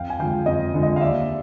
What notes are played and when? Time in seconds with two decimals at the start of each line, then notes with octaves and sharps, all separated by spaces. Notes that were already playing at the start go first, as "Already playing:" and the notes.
Already playing: F2 F5 G5
0.10 G#5
0.19 D3 F3 G#3 F5 G5
0.46 F2 D#5
0.74 D3 F3 G#3
0.83 D#5
0.96 F5
1.01 D#2 D5 E5